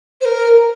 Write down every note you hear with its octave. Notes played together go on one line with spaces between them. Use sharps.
C5
A#4